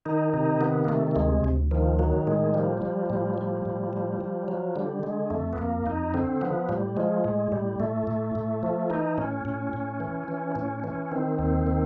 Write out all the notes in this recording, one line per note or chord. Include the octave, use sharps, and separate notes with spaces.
D#3 D#4
C3 D#4
D#3 B3
A#3
C3 A3
A3
D2 G#3
D2
D#3 F3
D#3 F#3
A2 G#3
F3 G3
F3 G3
A2 G3
F3 G3
A2
F3
F3
F3 F#3
D3 G3
D3 G#3
F2 A3
B3
F2 A#3
F2 D#4
D3 C4
F3 B3
A2 G3
F3 G#3
A2 G#3
A2 G3
A2 A3
A2
A2
F3
E3 D#4
A2 C#4
A2
A2
E3
E3
A2 C#4
E3 C#4
D#3 C4
D#2 C4
D#3